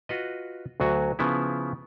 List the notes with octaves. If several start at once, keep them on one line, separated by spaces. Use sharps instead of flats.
F4 F#4 B4 D#5
D2 F#3 F#4 G#5
C#3 F3 B3 E4